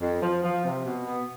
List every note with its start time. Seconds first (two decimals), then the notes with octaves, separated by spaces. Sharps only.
0.01 F2
0.22 F3
0.44 F3
0.64 C3
0.85 B2
1.07 B3